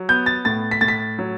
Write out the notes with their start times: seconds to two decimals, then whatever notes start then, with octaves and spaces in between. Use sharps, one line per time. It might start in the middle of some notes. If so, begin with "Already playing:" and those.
Already playing: F#3
0.09 B3 G6
0.26 A6
0.45 A2 A6
0.71 B6
0.81 A2 A6
0.88 B6
1.19 F#3